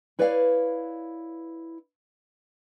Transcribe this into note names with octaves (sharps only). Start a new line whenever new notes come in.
E4 B4 C#5 D5 E5 F5